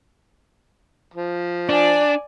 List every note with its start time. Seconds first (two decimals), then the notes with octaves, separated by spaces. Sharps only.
1.14 F3
1.69 D4 D5 G#5